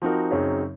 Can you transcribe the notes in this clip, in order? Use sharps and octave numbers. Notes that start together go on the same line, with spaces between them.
F3 C4 D#4 F#4 A#4
F#2 C#3 F#3 C4 D#4